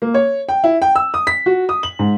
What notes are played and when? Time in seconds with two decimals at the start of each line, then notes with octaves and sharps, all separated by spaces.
0.02 A#3
0.14 C#5
0.49 G5
0.64 E4
0.82 G5
0.95 E6
1.14 D#6
1.27 B6
1.46 F#4
1.69 D#6
1.83 F#7
1.99 G#2